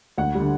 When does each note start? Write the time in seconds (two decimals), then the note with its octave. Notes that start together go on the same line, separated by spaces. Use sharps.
0.18 D2 F#5
0.35 G3
0.40 D3